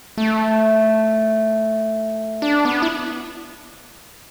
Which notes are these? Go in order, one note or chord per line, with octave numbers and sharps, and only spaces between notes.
A3
D4
B3
E4